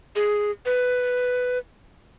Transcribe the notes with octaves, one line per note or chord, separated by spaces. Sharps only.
G#4
B4